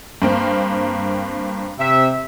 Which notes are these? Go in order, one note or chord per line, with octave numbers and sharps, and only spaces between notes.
G2 A#3 C4
C3 E5